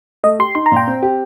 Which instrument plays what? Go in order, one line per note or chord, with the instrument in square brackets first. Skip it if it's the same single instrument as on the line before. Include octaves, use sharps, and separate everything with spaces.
[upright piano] A3 [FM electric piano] D#5
[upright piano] G4 [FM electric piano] C6
[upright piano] D#4 [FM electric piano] C6
[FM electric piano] A#5
[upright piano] A#2 [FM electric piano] G5
[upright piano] C4
G4